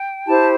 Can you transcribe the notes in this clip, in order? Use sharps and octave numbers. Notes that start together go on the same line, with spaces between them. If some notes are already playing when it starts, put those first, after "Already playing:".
Already playing: G5
E4 G4 C5 A5